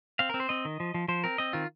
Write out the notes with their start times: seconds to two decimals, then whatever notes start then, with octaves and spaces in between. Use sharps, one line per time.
0.19 C4 F5
0.29 A#4
0.34 C4
0.40 C5
0.49 C4 D#5
0.65 D#3
0.80 F3
0.94 F3
1.08 F3 C5
1.24 C4 A#4
1.38 C4 D#5
1.53 D#3 F4